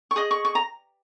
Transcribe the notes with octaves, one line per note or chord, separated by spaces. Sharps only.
C#6
G#4 D#5 D#6
C#6
C#6
A#5